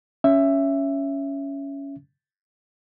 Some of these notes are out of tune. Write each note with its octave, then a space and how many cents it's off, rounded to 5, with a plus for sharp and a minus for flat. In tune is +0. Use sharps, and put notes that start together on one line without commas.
C#4 +10 E5 +10